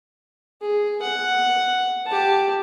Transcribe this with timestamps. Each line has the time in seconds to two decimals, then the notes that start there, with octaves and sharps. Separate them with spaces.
0.61 G#4
1.02 F#5
2.07 G4 A5